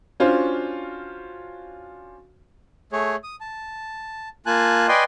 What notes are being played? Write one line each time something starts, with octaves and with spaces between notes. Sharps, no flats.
C#4 D4 F4 F#4 C5
A3 G#4 C#5
D#6
A5
A#3 F4 G#5 A5 F#6
B4 D5 D#5 G5 G#5 C6